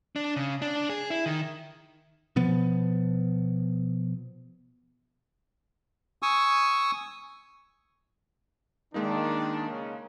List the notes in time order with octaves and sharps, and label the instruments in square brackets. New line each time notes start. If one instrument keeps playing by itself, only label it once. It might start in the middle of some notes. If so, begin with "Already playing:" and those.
[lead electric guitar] D4
C#3
D4
G#4
E4
D#3
[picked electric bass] B2 F3 B3
[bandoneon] G#5 C#6 D#6 E6
[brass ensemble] D#3 D4 [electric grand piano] G#3 A#3 D#4
[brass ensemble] C#3 C#4